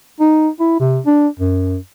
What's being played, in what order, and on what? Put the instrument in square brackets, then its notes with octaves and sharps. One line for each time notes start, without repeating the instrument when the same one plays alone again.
[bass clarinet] D#4
E4
C3
D4
F#2